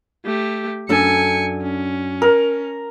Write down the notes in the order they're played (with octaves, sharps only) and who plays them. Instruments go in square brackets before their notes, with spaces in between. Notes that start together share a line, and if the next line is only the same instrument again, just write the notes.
[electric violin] A3 G4
[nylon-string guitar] F#2 D4 A4 [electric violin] G#5 C#7
[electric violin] C#4
[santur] A#4